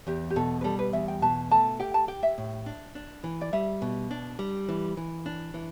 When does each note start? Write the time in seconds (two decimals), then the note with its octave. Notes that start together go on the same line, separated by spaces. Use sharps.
0.07 E2 G4
0.30 G4
0.36 B2 A4
0.61 B4
0.64 G3 A4
0.79 B4
0.93 E2 E5
1.08 G5
1.22 B2 A5
1.51 A3 A5
1.80 G4 G5
1.94 A5
2.08 G4 G5
2.23 E5
2.38 A2
2.66 D4
2.95 D4
3.24 E3
3.41 D5
3.53 G3 E5
3.82 B2
4.11 D4
4.39 G3
4.69 E3
4.97 E3
5.26 D4
5.54 E3